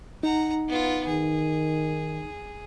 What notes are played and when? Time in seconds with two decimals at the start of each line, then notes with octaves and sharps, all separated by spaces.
0.23 D#4 F#5 A#5
0.68 B3 F4
1.07 D#3 G#4